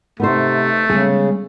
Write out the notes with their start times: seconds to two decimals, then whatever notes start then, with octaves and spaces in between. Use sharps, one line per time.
0.20 C3 A3 B3 D#4 C5
0.90 C#3 G3 G#3 B3 G#4